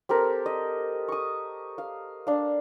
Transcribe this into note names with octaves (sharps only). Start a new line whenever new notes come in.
C4 G4 A4 A#4
D#5
C#6 D#6
F5
D4 F5